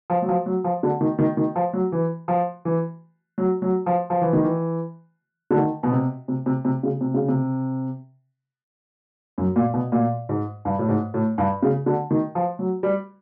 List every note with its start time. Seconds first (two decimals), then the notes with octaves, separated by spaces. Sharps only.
0.10 F3
0.22 F#3
0.29 F3
0.46 F#3
0.64 F3
0.83 D3
1.01 D#3
1.19 D#3
1.37 D#3
1.56 F3
1.73 F#3
1.92 E3
2.28 F3
2.65 E3
3.38 F#3
3.62 F#3
3.86 F3
4.10 F3
4.21 E3
4.33 D#3
4.44 E3
5.51 D3
5.56 D#3
5.83 B2
5.92 C3
6.28 C3
6.46 C3
6.65 C3
6.83 C#3
7.01 C3
7.14 C#3
7.28 C3
9.38 F#2
9.56 A#2
9.74 B2
9.92 A#2
10.29 G#2
10.65 G2
10.79 A2
10.89 G#2
11.14 A2
11.38 G2
11.62 C#3
11.86 D3
12.11 D#3
12.35 F3
12.59 F#3
12.83 G3